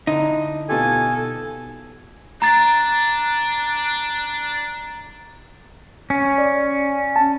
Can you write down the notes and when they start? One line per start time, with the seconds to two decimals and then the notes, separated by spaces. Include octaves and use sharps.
0.07 D3 D#4 E4
0.69 B2 F4 G4 A4 G#5
2.42 D4 A#5 A6
6.10 C#4
6.38 D5
7.16 A5